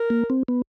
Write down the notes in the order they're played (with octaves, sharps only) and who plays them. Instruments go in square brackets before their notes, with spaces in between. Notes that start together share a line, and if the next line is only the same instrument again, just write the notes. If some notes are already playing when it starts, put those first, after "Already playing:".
Already playing: [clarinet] A#4
[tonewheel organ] A#3
C4
B3